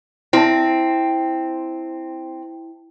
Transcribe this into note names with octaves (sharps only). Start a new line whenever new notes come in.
C4 E4 A5